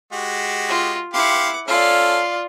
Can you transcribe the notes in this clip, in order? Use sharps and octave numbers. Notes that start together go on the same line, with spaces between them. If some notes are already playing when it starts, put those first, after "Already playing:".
G#3 F#4 G4
F4
E4 G4 F5 F#5 C6 D6
C#4 F4 A4 D5 F5